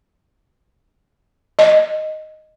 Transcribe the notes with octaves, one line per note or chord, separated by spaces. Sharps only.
D#5